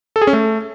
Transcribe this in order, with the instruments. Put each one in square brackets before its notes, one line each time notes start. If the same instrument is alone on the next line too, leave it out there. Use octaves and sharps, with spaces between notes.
[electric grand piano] A4
G#4
C#4
A3